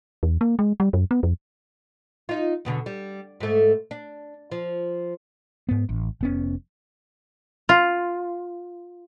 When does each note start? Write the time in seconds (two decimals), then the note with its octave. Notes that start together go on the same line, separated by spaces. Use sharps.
0.23 E2
0.41 A#3
0.59 G#3
0.80 G3
0.93 F#2
1.11 B3
1.23 F2
2.29 D#4 F4
2.65 E2 B2 D3
2.86 G3
3.40 G#2 A3
3.91 D4
4.52 F3
5.69 G#2 B3
5.89 A1
6.21 F1 B3 C#4
7.69 F4